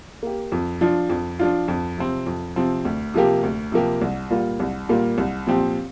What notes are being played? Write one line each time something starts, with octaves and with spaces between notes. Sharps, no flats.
A#3 G4
F2
F3 D4 F4
F2
F3 D4 F4
F2
C3 F3 C4
F2
C3 F3 C4
D2
C3 F3 A#3 G4
D2
C3 F3 A#3 G4
C2
A#2 G3 A#3 F4
C2
A#2 G3 A#3 F4
C2
A#2 F3 C4 G4